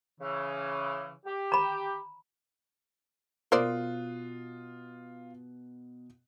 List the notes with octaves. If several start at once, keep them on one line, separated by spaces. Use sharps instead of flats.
C#3 E3
G4
A#5 B5
B2 F4 A#4 C5 D5 D#6 F#6